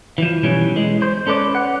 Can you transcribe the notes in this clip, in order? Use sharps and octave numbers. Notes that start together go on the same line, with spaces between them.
E3 F3
B1 E3 G3 C#4
G#3
C5
C#4 A4 B4 D5
F#5